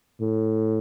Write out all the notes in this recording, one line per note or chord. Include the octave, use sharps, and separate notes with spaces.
A2